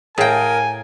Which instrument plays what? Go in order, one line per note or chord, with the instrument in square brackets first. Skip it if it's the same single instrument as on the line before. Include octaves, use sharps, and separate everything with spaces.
[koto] A2 G5 [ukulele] G#4 F5 [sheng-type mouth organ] A#4 [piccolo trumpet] G#5